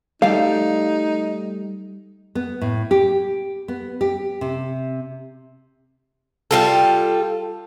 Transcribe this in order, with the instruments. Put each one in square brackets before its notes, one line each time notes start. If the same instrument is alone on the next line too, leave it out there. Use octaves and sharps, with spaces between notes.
[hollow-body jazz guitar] G3 A3 [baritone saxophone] D#4 [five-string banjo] F5
[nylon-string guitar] B3
A2
G4
B3
G4
C3
[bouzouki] G3 F4 A4